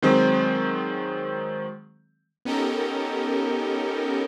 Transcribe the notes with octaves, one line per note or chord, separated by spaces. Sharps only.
D#3 F#3 G#3 C4
B3 C#4 D#4 G4 A4 A#4